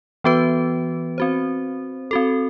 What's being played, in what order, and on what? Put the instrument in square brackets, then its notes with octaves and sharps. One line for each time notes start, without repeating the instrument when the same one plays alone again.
[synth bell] E3 B3 F#4 B4
C4 F#4 C5
C4 F#4 A4